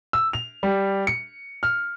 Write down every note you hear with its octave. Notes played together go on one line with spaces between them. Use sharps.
E6
F7
G3
C#7
F6